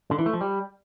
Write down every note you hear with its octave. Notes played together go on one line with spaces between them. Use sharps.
D3
E3
A3
F3
G3